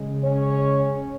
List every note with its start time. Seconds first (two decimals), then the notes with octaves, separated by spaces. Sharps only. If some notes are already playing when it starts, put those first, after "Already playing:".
Already playing: C#3 G#3
0.23 C#4 C#5